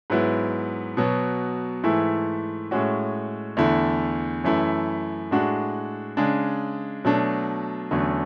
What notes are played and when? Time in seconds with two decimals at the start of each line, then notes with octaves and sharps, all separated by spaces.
0.10 G#2 F#3 B3 E4
0.97 B2 F#3 B3
1.84 G#2 E3 A3 E4
2.71 A2 G#3 C#4 F#4
3.57 E2 D3 A3 E4
4.44 F#2 E3 A3 E4
5.31 A2 G#3 D4 F#4
6.17 C#3 G#3 D4
7.05 B2 F#3 A3 D4
7.91 E2 D3 F#3 A3 C#4